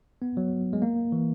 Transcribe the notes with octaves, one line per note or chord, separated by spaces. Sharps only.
B3
F#3
G#3
A#3
E3